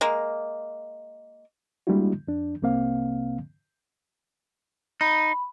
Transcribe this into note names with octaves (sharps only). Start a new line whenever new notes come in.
G#3 A#3
G3 G#3 A#3 D4 E4 F#4
F2 D4
C2 C3 A#3 C4 F5
D#4 B5